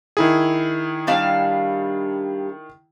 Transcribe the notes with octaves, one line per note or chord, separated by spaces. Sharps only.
D#3 E4 G#4
G3 D4 F5